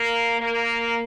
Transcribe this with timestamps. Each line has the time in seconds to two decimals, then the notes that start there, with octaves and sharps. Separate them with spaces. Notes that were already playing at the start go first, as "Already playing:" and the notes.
Already playing: A#3
0.40 A#3